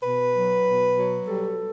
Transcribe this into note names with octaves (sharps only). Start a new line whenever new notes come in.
B2 B4
F#3
B2
F#3
G3 A4